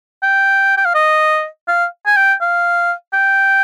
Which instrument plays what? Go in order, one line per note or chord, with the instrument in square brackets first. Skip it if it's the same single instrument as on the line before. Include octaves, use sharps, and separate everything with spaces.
[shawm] G5
G5
F5
D#5
F5
G#5
G5
F5
G5